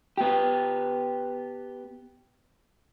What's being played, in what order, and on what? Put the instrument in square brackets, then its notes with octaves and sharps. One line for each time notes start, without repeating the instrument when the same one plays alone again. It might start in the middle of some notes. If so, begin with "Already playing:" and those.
[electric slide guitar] B3 G4